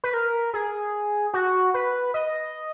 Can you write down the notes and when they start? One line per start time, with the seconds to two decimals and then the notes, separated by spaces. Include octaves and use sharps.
0.04 B4
0.14 A#4
0.54 G#4
1.34 F#4
1.74 B4
2.14 D#5